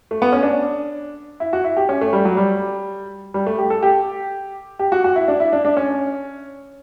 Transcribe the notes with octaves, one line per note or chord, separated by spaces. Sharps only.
A3
B3
C#4
D4
E4
F#4
E4
G4
C#4
A3
G3
F#3
G3
G3
A3
G4
A4
G4
G4
F#4
F#4
E4
D4
E4
D4
D4
C#4